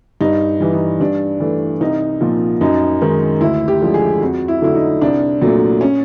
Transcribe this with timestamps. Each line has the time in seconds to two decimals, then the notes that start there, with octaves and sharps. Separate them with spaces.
0.21 G2 D#4
0.60 E3 G3
0.73 D#4
1.00 G2 D4
1.40 E3 A3
1.80 C2 D#4
2.21 A#2 F3
2.61 F#2 D#4
3.02 D#3 G#3
3.41 D2 E4
3.68 G4
3.81 D3 F3 G#3
3.94 G#4
4.21 F2 F#4
4.48 E4
4.62 D3 F#3 A3 E4
4.75 D#4
5.01 C2 D4
5.42 A#2 F#3 A3
5.81 C#4